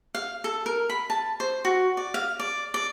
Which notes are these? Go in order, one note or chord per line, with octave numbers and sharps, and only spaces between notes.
F5
A4
A#4
B5
A5
C5
F#4
D5
F5
D5
D5